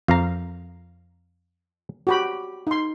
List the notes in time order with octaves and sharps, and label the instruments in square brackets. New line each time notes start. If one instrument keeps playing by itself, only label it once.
[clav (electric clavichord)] F2 A#5 [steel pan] F5
[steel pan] F#4 G4 B5
D#4 C6